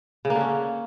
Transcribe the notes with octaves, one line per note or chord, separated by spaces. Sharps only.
C#3
A#3
D3
C#4